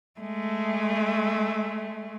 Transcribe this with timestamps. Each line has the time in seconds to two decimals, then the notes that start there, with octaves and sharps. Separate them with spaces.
0.20 G#3 A3